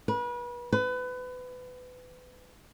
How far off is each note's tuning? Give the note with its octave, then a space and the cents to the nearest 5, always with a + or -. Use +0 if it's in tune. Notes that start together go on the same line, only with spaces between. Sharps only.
B4 -35
B4 +25